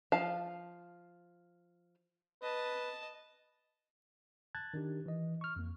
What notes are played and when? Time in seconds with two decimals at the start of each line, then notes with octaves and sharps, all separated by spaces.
0.12 F3 F5 A5
2.42 B4 D#5 A5
4.55 A5 F#6 G#6 A6
4.74 D#3 D4 G4
5.06 E3 D#5
5.41 C#6 F6
5.56 F2 A#3